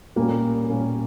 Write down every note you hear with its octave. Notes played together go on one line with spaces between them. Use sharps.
A#2 G3 A#3 C#4
A#2 G3 A#3 C#4